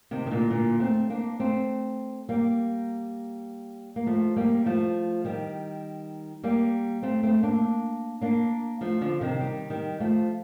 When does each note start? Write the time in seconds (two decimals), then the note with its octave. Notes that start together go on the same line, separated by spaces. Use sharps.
0.11 C3 D#3
0.27 D#3
0.31 A#2 D3
0.50 A#2 D3
0.80 A3 C4
1.10 A#3 D4
1.39 A3 C4
2.29 G3 A#3
3.96 A#3
4.06 F3 A3
4.36 G3 A#3
4.66 F3 A3
5.25 D#3 G3
6.44 G3 A#3
7.03 A3 C4
7.23 A3 C4
7.42 A#3 D4
8.21 A#3 D4
8.81 F3 A3
9.01 D3 F3
9.21 C3 D#3
9.40 D#3 G3
9.70 D#3 G3
10.00 F3 A3